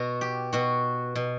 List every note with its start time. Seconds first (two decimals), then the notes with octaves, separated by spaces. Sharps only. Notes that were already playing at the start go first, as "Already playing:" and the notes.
Already playing: B2 F#4
0.21 G4
0.53 B2 F#4
1.15 B2